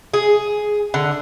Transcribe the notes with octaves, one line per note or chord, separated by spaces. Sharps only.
G#4
D3